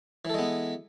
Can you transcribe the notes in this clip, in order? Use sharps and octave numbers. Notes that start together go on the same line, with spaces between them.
E3 G#3 B3 A4